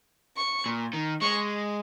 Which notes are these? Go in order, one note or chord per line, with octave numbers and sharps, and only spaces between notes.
C#6
A#2
D#3
G#3 C#6